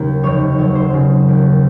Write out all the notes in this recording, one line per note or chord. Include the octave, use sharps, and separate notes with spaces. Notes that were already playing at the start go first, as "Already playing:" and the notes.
Already playing: D#2 C#3 F#3
F1 C#5
F#3 C#5
C5
C#3
D#2